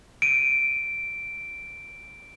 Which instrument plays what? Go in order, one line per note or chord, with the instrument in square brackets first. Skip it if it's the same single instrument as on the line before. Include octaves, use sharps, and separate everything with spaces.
[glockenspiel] D7 D#7